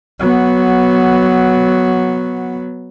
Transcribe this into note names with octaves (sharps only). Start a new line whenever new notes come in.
F#3 B3